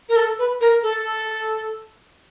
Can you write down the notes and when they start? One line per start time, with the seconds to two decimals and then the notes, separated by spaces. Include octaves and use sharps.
0.09 A#4
0.16 A4
0.39 B4
0.61 A#4
0.83 A4